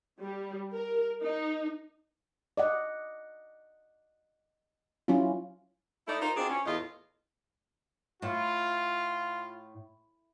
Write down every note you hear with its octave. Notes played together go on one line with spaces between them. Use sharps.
G3
A#4
D#4
D5 D#5 F#5
F#3 C#4 E4 F4
A3 D#4 E4 D5 D#5
D#4 F4 A#4 C5
C4 D4 D#4 F4 F#4 G#4
C#4
E2 A2 A3 F4 D#5
A2 F4